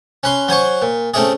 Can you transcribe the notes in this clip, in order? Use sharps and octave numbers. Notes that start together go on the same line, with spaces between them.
C#4 B4 C6
F#3 C5 G#5 C#6
A#2
A3 C4 C#4 E4 G#4